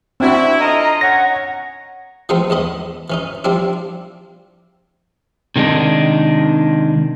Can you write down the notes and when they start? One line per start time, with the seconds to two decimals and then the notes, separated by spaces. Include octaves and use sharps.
0.20 C4 D4 E4 F#4
0.59 F4 A4 D#5 A#5
1.01 C#4 C#5 F#5 A#6
2.29 E3 F3 G#3 A3 B3 C4
2.50 E2 G#2 D#5 B5
3.10 E3 C#4 D#4
3.44 F3 G3 C4 D4 E4
5.56 C3 D#3 G#3 D4 D#4